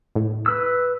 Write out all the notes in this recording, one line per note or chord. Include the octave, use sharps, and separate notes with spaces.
A2
B4 E6